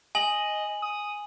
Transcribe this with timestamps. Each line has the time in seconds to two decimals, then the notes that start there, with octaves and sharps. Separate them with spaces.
0.15 D#5 G#5 F#7
0.82 D#6